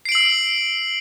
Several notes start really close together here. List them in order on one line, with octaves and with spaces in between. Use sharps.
C7 D7 F#7 E6